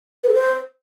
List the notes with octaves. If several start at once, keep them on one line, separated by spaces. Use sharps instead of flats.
B4
A4
C5